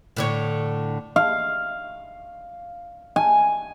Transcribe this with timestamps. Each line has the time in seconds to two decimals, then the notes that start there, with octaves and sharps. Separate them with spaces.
0.17 A2 D3 C#5
1.16 F5
3.16 G#5